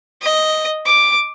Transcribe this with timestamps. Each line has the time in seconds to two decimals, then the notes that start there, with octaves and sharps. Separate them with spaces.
0.22 D#5
0.86 D6